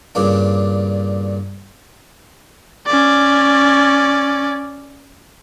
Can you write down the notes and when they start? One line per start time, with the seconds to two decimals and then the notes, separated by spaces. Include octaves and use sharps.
0.15 G2 A#2 C#3 D4
2.87 C#4 D5